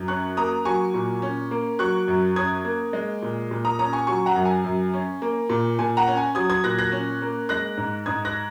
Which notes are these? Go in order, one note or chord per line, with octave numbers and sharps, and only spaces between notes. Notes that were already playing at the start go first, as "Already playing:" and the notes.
Already playing: F#2
C#4 C#6 F#6
A#3 A#5 D#6
F#3 G#5 C#6
A#2
C#4
A#3
F#3 C#6 F#6
F#2
C#4 D#6 G#6
A#3
G#3
A#2
A#2
A#5 D#6
C#4 A#5 D#6
G#5 C#6
F#3 G#5 C#6
F#5 A#5
F#2
G#5
F#2
C#4
A#3
A#2
A#2 G#5
F#5 A#5
C#4
G#5
F#3 D#6 G#6
D#6 G#6
A#2 F#6 A#6
F#6 A#6
C#4
A#3
G#3 F#6 A#6
G#2
G#2 D#6 G#6
F#6 A#6